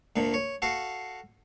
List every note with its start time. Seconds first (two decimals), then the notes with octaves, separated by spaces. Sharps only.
0.16 D2 A#2 D3
0.34 C#5
0.62 F#4 A4 F5